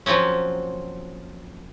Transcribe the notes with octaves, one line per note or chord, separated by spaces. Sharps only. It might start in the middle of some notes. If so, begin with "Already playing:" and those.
F3 F#3 A#3 C4 C#4